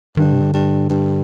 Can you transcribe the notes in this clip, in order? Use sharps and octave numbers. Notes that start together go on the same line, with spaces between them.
G2 D#3
D3
C3
D3
G2
G2